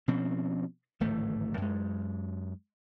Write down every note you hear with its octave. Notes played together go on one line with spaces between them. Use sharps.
B2 F3 C4 C#4
D1 G#1 E3 A3
F#2 G#3